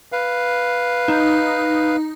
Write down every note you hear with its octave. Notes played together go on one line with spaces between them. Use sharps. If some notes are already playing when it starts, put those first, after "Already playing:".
B4 F5
D#4